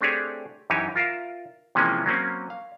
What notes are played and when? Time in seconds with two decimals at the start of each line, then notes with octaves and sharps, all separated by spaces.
0.01 A3 C4 D4 G4 G#4 C#5
0.70 F#2 E3 D#4 G4 C#5 G#5
0.95 F4 A#4 E5 F5
1.75 C3 E3 F3 G#3 A#3 C#4
2.06 F#3 A#3 C4 C#4
2.50 F5